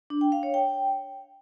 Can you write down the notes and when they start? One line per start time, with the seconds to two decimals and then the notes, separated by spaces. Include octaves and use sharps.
0.10 D4
0.21 G5
0.32 F5
0.43 C#5
0.54 G5